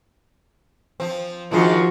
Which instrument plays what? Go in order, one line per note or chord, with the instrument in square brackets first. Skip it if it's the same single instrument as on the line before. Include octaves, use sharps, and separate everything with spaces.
[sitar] F3 C4
[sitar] D#3 D4 G#4 [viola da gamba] F3 F#4